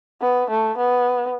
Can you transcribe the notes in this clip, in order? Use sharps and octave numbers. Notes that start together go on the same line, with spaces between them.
B3
A3
B3